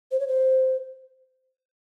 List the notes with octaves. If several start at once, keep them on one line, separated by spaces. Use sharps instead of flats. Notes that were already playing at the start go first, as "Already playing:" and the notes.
C5
C#5
C5